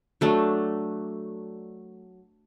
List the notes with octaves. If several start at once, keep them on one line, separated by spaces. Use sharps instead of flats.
F#3 A3 D4